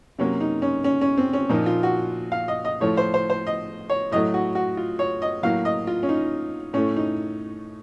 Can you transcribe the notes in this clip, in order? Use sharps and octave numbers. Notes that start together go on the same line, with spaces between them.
C3 F#3 A#3 C#4
D#4
C#4
C#4
C#4
C4
C#4
A#2 F3 A#3 D#4
F4
F#4
F5
D#5
D#5
A2 F3 A3 C#5
C5
C5
C5
D#5
C#5
A2 F#3 A3 D#5
F#4
F#4
F4
C#5
D#5
A2 F#3 A#3 F5
D#5
F4
C#4
D#4
A2 A3 C#4
D#4